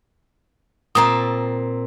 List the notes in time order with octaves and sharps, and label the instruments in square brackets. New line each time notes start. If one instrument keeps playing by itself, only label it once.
[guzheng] A#2 C4 A5 [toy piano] A#5 D#6